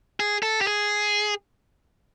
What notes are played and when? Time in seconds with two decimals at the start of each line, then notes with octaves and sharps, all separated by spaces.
0.20 G#4
0.43 A4
0.61 G4
0.67 G#4